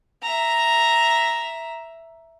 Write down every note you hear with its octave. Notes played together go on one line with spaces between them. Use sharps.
E5 A#5